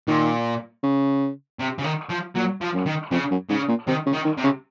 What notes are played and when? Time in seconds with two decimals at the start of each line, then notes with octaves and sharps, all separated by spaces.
0.07 A#2 D#3
0.83 C#3
1.59 C3
1.79 C#3
1.84 D#3
2.10 F3
2.36 A#2 F#3
2.61 F3
2.74 F#2
2.86 D#3
3.11 F2 C#3
3.31 F#2
3.49 G#2 C#3
3.68 A#2
3.88 C3 D#3
4.06 C#3
4.13 D#3
4.25 D#3
4.38 C3
4.44 C#3